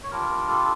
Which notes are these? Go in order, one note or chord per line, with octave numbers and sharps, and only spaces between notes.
C#5
G3 D4 F4 A#4
A#4
A4